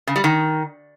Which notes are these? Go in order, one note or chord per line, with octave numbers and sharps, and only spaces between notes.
C#3
G3
D#3